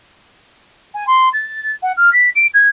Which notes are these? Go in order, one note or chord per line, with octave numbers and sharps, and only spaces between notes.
G#5
C6
A6
F#5
F6
B6
D7
G#6